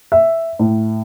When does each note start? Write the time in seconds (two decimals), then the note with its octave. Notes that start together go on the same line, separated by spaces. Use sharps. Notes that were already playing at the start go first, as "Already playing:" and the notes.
0.12 E5
0.59 A2